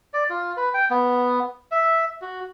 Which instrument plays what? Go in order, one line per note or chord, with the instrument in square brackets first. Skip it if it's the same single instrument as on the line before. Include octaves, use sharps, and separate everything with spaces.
[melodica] D5
F4
B4
G5
B3
E5
F#4